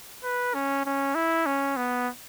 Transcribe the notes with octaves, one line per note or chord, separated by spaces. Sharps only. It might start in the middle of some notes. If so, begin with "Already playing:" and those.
B4
C#4
C#4
E4
C#4
B3